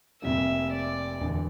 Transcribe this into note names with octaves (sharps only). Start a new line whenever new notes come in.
F1 F2 C3 G3 A#3 E5
D5
E1 E2 D3